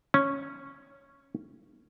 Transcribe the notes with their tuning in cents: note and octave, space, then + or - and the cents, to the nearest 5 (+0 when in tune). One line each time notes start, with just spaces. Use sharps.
C#4 -5